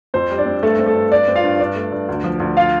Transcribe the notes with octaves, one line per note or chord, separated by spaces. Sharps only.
F2 C4 C5
G3
D4 D5
C4
G2 A3 A4
C4
A3 A4
G2
G2 D4 D5
C4
F4 F5
G2
G2 D4 D5
A3
G2
D2
F3
D2
F4 F5